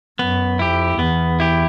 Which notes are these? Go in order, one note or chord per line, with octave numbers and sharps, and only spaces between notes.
F#2 B3
F2 E4 G4
E2 B3
E4 G4